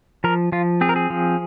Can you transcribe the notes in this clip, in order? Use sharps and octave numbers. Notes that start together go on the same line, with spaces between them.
F3 A#4
F3 F4
C4 G#4
A#4
G#4
F3